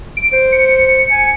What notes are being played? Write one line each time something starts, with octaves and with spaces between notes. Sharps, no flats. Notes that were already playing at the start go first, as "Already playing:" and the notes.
D7
C5
C#7
G#5